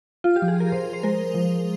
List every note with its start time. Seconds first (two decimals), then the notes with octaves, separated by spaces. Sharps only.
0.24 F4
0.36 G4
0.42 F3
0.48 G#4
0.60 A#4
0.72 F3 C5
0.93 C5
1.03 G#3 A#4
1.34 F3